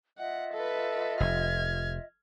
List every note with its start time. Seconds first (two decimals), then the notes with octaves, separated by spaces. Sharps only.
0.18 F4 D#5 E5 F#5
0.53 A4 B4
1.20 F1 F6 G#6